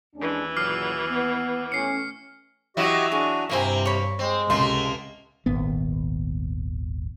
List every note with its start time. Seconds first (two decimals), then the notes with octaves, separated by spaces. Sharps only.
0.16 D#2 E3 G#3 C#4 D4
0.57 A#2 C#3 F#3 D6 F6 C7
1.09 B3
1.72 A2 C#4 C7 C#7
2.77 E3 F#3 E4 F#4 G4 D#5
3.12 D4 F#4 G#4
3.49 G2 C3 A#3 C4 D#4 E4 G#5
3.86 C#5 B5
4.19 G#3 C4
4.50 C#2 C3 A3 A#3 C6
5.46 D#1 G#1 D#2 B3